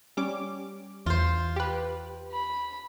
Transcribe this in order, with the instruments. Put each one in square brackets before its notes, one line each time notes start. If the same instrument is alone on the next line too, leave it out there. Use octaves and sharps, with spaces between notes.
[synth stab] G3 C#4 D6
[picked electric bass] E2 [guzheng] F4 C5
[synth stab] G4 B4
[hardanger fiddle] B5